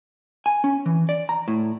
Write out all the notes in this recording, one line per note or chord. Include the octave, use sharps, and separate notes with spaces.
G#5
C#4
E3
D5
A#5
A2